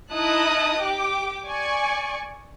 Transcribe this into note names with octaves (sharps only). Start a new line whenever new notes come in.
D#4 E4 D#5 A5 D#6 F#6
G4 G5 D6
D5 G#5 C#6